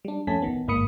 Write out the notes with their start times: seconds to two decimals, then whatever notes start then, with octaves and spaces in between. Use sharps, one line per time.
0.05 G3 D4
0.27 F2 A3 C#4 G#5 A5 B6
0.42 A1 D#3 B3
0.68 G1 G#2 A#3 B5 D#6 C#7